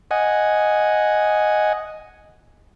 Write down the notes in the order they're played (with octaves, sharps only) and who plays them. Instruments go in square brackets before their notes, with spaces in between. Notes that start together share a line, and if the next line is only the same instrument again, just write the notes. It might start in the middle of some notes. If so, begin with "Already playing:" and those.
[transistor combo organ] D#5 F#5 G#5